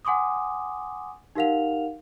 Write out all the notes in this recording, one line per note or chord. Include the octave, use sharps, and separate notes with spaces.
F#5 G#5 C6 D6 D#6
D#4 G4 A#4 F5 F#5 F7